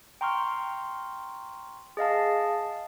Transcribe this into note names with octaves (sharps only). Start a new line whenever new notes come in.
G5 A#5 C6 C#6 F6
G#4 D#5 F5 A5